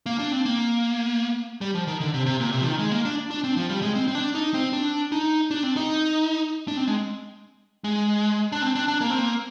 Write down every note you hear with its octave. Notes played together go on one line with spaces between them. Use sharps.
A#3
D4
C4
A#3
G3
F3
D#3
D3
C3
C3
A#2
C3
F3
D#3
G#3
A#3
D4
D4
C4
F3
G3
G#3
C4
C4
D4
D#4
C4
D4
D#4
D4
C4
D#4
D4
C4
G#3
G#3
D4
C4
D4
D4
A#3
C4
A#3